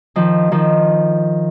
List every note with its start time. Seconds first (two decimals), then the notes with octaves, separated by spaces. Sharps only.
0.16 D#3 F3
0.52 D#3 F3